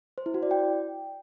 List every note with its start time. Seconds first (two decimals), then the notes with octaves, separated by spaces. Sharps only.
0.18 C5
0.26 E4
0.34 F#4
0.43 D5
0.51 G5